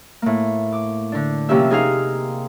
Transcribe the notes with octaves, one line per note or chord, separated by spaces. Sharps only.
A2 A#3
D6
D3 D4
C3 F3 A#3 C#4 G4 E5
D#4 G#4 A#4 C5 F5